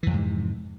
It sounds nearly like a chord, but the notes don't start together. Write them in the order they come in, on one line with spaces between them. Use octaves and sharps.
E3 F2 C3 G#2